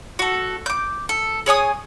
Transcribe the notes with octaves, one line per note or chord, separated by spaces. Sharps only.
F#4 A4
D6 G6
A4
G#4 C#5 G#5 D#6